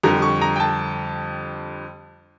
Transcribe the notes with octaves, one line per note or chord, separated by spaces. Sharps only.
F2 D3 G3 A#5
C#6
A#5
G5
A5